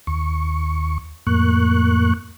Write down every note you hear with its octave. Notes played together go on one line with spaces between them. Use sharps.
D#2 C#6
F2 A2 A#3 C#6 F#6